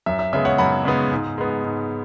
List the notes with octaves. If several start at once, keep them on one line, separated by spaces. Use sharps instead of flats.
F#2 E5
E5
C#3 G#3 B3 E5
C#5 F#5
F#2 F#5 B5
C#3 G#3 B3
G#2
G#3 B3
G#2